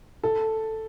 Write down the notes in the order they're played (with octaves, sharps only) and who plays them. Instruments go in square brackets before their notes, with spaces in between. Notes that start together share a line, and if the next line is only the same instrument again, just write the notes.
[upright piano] A4